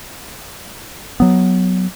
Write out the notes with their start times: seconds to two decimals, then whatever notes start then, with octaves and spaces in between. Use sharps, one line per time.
1.20 F#3 B3